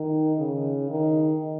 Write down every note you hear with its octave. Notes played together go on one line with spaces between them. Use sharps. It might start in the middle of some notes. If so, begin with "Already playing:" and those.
Already playing: D#3
C#3
D#3